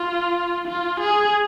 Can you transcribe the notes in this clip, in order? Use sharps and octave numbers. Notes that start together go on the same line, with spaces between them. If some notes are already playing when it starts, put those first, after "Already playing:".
Already playing: F4
F4
G#4